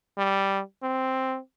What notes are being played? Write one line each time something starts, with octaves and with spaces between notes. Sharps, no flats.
G3
C4